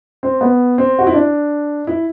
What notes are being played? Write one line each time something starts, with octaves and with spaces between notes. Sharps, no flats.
C4
B3
C4
F#4
E4
D4
E4